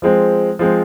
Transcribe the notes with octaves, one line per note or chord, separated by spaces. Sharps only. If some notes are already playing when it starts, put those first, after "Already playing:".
F3 G#3 C4
F3 G#3 C4